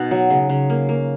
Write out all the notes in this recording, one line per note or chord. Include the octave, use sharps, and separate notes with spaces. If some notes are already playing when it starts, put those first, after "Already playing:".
Already playing: B2 D#4 F#4
F#3
C#3
C#3
A#3
A#3